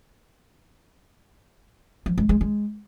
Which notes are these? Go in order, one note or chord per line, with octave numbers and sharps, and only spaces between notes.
F3
G#3
G#3
G#3